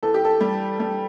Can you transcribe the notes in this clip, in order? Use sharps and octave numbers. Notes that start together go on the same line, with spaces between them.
E2 A4
G4
A4
G3
G3